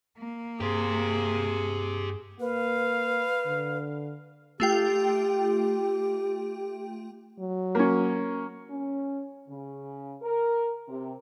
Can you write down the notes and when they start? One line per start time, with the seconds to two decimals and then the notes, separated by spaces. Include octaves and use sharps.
0.18 A#3
0.60 G2 G4 G#4 C5
2.40 A#3 B4 F5
3.46 D3
4.60 A3 F4 G4 G5
7.39 F#3
7.75 A#3 C#4
8.69 C#4
9.49 C#3
10.21 A#4
10.87 C3